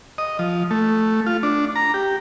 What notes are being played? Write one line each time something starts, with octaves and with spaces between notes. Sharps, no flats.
D#5
F3
A3
F4
D4
A#5
G4